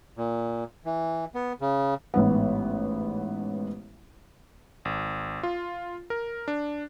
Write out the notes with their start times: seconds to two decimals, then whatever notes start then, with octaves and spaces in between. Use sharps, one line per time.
0.17 A#2
0.85 E3
1.34 B3
1.61 C#3
2.14 A1 G#2 B3
4.85 G#1
5.43 F4
6.10 A#4
6.48 D4